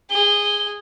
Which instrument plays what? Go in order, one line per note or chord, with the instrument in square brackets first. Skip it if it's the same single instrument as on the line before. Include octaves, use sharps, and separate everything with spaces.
[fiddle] G#4 [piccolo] G7